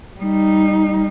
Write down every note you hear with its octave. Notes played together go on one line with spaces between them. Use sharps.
G3 D#4